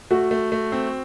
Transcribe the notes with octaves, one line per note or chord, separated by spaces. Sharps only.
A3 F#4
A3
A3
C4